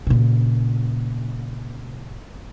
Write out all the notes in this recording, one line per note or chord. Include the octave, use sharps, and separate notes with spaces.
A#2 C#3